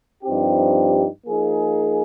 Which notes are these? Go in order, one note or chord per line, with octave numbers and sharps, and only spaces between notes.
G2 F3 C4 D#4 G4
F3 A#3 D#4 G#4